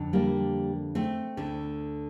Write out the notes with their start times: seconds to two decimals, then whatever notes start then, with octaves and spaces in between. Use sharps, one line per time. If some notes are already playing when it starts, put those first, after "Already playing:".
Already playing: F2 D3
0.13 G3 A#3
0.95 A3 C4
1.37 D2 D3